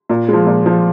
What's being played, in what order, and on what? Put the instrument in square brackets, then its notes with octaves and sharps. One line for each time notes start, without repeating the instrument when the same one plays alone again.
[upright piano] A#2
F3 G#3
A#2
F3 G#3